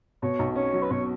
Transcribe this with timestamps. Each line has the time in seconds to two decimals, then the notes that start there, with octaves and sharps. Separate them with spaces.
0.23 B2 C#5
0.39 B1
0.56 C#4 C#5
0.73 F#3
0.82 B4
0.90 B2 C#5